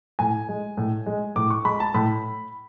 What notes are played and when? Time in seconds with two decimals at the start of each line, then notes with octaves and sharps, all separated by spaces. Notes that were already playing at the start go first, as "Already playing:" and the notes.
0.19 A2 G#5
0.49 G#3
0.77 A2
1.06 G#3
1.36 A2 D6
1.50 C#6
1.65 G#3 B5
1.80 A5
1.94 A2 B5